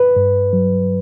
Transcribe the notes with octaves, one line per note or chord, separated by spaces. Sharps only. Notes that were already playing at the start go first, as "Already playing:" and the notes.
Already playing: B4
G2
F#3